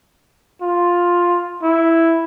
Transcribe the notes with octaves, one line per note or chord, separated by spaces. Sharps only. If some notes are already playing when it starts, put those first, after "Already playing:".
F4
E4